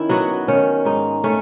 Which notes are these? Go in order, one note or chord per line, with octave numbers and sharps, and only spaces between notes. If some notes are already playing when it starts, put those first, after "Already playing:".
Already playing: D#3 C#4 E4
F#3 B3 F#4
D#3 C#4
G#2 D#4
A3 C#4